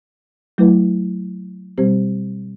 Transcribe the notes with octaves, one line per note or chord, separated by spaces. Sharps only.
F#3 A3 E4 B4
B2 G3 C4 G4 C5